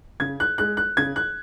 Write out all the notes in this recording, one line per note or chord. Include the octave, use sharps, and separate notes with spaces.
C#3 G#6
F#6
G#3 F#6
F#6
C#3 G#6
F#6